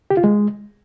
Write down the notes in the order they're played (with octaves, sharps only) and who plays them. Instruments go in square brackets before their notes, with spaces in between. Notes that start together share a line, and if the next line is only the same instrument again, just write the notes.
[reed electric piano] G4
F4
G#3